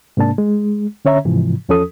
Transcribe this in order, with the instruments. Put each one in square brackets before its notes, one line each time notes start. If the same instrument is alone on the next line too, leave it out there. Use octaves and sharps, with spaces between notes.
[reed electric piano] G#2 C3 A#3 D4 A5
G#3
D3 C#4 C#5 E5 A#5
G#2 C3 E3 F3
E2 F3 C#4 A4 D#6